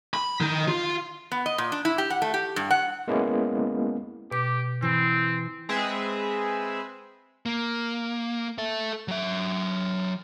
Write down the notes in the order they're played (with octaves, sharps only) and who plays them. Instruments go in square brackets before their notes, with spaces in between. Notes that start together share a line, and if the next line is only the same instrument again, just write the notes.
[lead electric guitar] B5
D#3
F4
[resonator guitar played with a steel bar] B3
D#5
A#2
D4
E4
G4
F#5
A3
G4
G2
F#5
[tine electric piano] G#3 A#3 B3 C#4 E4
[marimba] B2 D6 [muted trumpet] G4
[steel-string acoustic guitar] E3 [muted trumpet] C4
[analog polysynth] G#3 C4 G#4 B4 E5
[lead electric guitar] A#3
A4 E5
F#3 E5